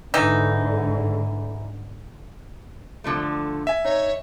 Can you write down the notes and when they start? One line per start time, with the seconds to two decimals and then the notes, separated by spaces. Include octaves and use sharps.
0.14 G#2 D3 E3 D#4
3.04 D3 F3 A3
3.67 E5 G#5
3.85 D#4 C#5